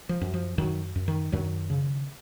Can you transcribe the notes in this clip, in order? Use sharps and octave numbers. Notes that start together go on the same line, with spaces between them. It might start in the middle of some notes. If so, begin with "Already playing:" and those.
F3
F#2
F3
F#2 D#3 F#3
F#2
D#3
F#2 D#3 F#3
C#3